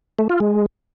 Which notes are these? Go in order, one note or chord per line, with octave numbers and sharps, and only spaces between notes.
A3
F4
G#3